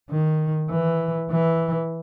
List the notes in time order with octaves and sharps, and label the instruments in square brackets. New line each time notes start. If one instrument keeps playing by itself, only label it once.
[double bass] D#3
E3
E3